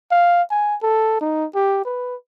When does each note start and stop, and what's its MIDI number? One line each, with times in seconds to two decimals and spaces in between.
0.11 0.42 77
0.51 0.75 80
0.82 1.21 69
1.21 1.45 63
1.55 1.84 67
1.85 2.15 71